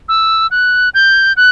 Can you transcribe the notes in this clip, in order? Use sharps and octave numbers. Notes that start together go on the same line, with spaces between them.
E6
F#6
G6
F#6